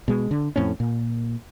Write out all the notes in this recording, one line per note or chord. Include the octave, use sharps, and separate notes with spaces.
B2 G#3
D3
F2 A2 C4 C#4
A#2